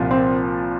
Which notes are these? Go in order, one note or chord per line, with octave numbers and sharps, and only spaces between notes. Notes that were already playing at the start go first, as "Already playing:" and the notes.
Already playing: C2 A#2 F3
C4